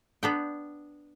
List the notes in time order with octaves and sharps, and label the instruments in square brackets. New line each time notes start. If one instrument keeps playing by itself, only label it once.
[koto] B3 D4 G5